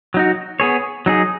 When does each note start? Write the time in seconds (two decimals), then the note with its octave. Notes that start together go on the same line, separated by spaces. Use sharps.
0.14 F#3 D#4 F#4
0.60 B3 G#4 C#5
1.06 F#3 D#4 G#4